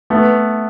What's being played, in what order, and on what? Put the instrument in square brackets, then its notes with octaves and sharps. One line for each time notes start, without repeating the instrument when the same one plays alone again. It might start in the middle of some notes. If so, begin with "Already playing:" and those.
[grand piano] A3 B3